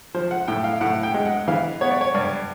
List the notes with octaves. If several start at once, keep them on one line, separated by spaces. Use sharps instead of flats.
F3 C5
F#5
A2 G5
F5
A2 F#5
G5
G#3
F#5
E3 F5
B3 C#5
D5
C#5
G2 D5